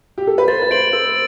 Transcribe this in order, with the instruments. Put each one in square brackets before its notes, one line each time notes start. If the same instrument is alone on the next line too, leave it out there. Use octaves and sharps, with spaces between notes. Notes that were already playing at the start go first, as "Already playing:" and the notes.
[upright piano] G4
A4
B4
[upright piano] C5 [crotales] A6
[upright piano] B4
[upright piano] C5 [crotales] D7 F#7
[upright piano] C5 [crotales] E6